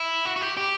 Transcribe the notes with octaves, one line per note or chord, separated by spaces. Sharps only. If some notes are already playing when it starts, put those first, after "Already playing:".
Already playing: E4
F#4
F#4
G4
G4